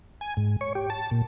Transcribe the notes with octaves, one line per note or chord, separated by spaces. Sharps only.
G#5
G#2
C#5
G4
A5
A#2